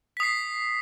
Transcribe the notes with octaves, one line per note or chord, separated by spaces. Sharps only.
D#6 B6 C7